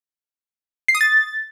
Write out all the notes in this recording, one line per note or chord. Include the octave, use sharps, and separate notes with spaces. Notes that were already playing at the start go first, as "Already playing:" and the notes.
C7
D#6
A6